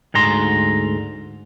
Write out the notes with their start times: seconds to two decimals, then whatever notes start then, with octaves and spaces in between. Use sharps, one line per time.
0.14 D2 G#2 A#5 C6